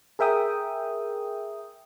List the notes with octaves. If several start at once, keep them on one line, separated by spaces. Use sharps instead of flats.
G#4 A#4 E5 G5 D#6